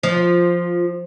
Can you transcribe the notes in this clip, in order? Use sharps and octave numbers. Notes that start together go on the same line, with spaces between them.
F3